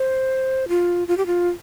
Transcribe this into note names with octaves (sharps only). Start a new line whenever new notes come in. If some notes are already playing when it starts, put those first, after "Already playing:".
Already playing: C5
F4
F4
G4
F4